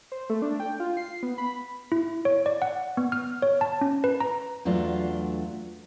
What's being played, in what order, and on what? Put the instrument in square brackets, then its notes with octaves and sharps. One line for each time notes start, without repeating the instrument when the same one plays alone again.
[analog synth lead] C5
A3
D4
G5
F4
C7
B3
B5
[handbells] E4
C#5
D5
F#5
B3
F6
C#5
A5
C#4
B4
A#5
[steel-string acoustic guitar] E2 F#3 A3 D4 F4